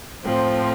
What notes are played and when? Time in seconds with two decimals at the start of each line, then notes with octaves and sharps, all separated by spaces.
0.23 A2 F3 C4